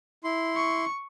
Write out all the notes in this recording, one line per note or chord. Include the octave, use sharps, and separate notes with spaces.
E4 C6
C#6